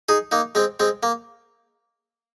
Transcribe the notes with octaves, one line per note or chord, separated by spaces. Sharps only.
D#4 G#4
A#3 D#4
G#3 C4
G#3 C4
A#3